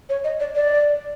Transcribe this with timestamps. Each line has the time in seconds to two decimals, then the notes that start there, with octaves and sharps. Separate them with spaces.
0.09 C#5
0.24 D#5
0.40 D5
0.55 D5